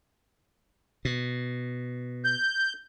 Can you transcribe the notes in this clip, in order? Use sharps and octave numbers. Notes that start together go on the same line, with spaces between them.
B2
G6